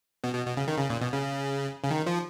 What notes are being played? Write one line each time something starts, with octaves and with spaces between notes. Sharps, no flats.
B2
B2
B2
C#3
D#3
C#3
A#2
B2
C#3
C#3
D#3
F3